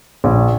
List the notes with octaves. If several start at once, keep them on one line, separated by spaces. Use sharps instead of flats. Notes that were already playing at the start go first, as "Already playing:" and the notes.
A#1